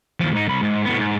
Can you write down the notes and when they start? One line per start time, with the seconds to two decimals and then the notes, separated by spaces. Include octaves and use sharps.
0.20 D#2 F3
0.34 G#2 D#4
0.48 C2 B5
0.62 G#2
0.85 A2 B3
0.99 G#2